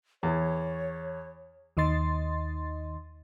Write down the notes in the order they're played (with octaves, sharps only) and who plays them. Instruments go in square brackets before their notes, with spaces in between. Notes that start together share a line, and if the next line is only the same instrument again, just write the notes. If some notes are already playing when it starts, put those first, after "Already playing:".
[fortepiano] E2 [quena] C#5
[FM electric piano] D#2 D#3 D#5 C6 A6